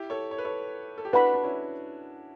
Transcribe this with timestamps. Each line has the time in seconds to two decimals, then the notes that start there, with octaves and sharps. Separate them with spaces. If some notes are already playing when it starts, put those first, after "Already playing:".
Already playing: E4 G4
0.10 A4 C#5
0.31 C#5
0.38 B4
0.45 A4 C#5
0.98 A4
1.05 G4
1.13 D4 F#4 B4 F#5 B5
1.34 D4
1.44 C#4 E4